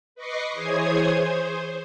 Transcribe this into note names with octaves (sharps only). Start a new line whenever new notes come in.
B4 D#5 C#6 D6 A#6 C7
E3 G#4 C5 C#5 D#6 G#6
C5